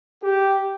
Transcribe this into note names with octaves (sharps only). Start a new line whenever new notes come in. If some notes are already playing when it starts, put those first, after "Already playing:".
G4